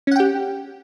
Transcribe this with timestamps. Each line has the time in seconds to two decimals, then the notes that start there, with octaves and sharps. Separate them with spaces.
0.07 C#4
0.11 F#5
0.16 G5
0.20 G4